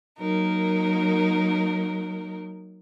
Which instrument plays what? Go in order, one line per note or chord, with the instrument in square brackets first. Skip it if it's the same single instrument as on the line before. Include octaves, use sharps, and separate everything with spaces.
[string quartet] F#3 A#3 D#4 A#4